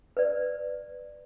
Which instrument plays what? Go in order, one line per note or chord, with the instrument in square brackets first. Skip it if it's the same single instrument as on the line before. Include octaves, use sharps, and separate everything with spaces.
[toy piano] B4 D5